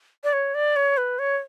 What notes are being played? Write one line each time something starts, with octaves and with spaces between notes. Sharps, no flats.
D5
C#5
D5
C#5
B4
C#5